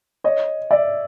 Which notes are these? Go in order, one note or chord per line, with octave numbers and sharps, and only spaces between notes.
C#5 D#5
D5 E5